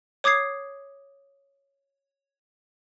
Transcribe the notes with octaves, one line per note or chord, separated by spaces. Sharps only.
C#5 D6 D#6 G#6 C7